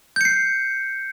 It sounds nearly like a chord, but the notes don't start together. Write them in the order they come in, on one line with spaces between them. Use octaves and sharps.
G6 C#7 C7